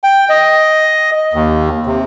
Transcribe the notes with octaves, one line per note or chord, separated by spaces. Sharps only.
G5
D#5
D#2
C3